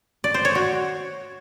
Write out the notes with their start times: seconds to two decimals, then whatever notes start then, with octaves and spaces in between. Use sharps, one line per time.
0.24 D5
0.34 C5
0.45 C#5
0.55 F#4